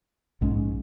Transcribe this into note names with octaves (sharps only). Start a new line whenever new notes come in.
A#1 G#2 G#3 C#4